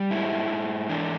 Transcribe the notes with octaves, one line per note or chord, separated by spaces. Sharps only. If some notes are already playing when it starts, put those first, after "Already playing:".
Already playing: G3
G#2 E4
G#2
E3 D4